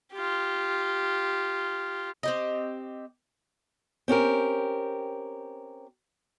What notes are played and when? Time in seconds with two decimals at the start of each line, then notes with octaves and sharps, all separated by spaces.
0.13 F4 G4
2.23 C4 G4 D#5
4.08 C4 C#4 G4 A#4